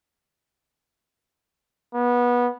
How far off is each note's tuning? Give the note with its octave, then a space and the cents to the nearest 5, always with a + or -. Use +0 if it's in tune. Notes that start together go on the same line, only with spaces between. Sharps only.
B3 -20